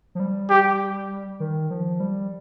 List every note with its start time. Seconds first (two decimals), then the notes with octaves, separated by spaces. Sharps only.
0.15 F3
0.20 G3
0.50 G4
1.40 D#3
1.70 F3
2.00 G3